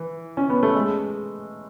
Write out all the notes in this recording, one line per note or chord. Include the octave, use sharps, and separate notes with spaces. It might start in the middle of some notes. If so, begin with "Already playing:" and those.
Already playing: E3
C#4
B3
A3
G#3